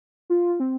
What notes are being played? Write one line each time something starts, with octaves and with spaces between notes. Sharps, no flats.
F4
C4